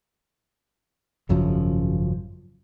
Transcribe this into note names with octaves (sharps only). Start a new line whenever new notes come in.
G#1 F#2 C#3 F3